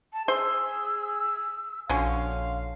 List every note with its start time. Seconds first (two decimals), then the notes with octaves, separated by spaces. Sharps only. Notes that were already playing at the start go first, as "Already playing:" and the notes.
0.13 A5
0.28 G#4 C5 C6 E6
1.89 A#1 D3 C#4 F#4 F5 C6